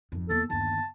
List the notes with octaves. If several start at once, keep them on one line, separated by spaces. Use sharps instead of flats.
G#1 F2
E2 A#3 A4
G1 D#2 A5